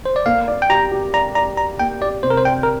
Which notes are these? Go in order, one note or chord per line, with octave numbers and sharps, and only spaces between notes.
C5
D5
A#3 F5
D5
G5
G4 A#5
G4
D5 A#5
D5 A#5
D5 A#5
A#3 G5
G4 D5
C3 C5
A#4
C5
D5 G5
A#4